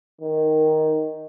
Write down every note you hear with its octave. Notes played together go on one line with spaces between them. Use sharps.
D#3